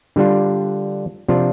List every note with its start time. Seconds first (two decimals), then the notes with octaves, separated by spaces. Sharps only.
0.16 D3 G3 D4 F4
1.28 C3 F3 D4 F4